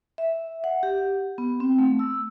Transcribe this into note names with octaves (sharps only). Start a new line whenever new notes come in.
E5
F#5
G4
B3
C4
A3
E6